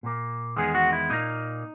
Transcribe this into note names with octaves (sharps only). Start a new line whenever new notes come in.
A#2 A#3
E2 D#3 G#3 B3 G#4
F#4
E4
A#2 A#3 D#4